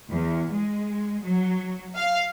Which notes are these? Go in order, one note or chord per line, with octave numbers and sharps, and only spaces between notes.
E2
G#3
F#3
F5